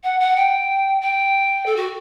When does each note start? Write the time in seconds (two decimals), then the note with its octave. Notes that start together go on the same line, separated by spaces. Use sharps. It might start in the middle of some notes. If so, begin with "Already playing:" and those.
0.03 F#5
0.20 F#5
0.36 G5
1.01 G5
1.66 A4
1.76 F#4